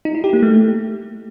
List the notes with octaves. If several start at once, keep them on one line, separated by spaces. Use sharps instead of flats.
D#4
E4
G4
A#3
A3